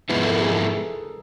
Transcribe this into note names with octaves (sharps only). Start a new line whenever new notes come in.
G#2 F3 G#3 B3 E4 B4
A4
A#4
G#4
A4